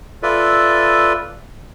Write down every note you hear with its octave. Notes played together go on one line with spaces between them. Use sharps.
F4 A4 B4 D5 E5